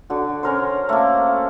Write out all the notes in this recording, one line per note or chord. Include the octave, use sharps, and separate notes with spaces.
D3 F#4
C#4 A#4 C5
A3 A#3